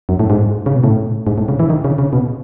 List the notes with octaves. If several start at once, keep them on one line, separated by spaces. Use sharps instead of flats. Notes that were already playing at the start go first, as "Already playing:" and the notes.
F#2
A2
G#2
C#3
B2
A2
G#2
A2
C#3
E3
D#3
C#3
C#3
B2